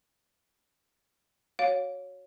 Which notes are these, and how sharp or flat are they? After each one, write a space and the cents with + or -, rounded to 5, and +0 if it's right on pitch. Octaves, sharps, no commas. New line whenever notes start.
F#4 -5 C#5 +0 F5 +25